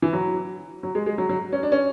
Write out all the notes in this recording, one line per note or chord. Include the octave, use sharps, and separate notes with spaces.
E3
F#3
F#3
G#3
G#3
F#3
F#3
C#4
D4
C#4